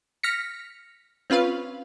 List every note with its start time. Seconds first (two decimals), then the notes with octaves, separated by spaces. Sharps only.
0.23 F6 A#6 B6 C#7
1.30 C4 C#4 F4 B4 F5